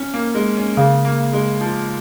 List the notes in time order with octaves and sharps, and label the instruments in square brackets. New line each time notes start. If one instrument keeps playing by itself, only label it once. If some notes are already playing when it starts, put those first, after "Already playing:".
Already playing: [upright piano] C#4
A#3
G#3
C#4
[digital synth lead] C#3 [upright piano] A#3
[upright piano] A#3
G#3
F3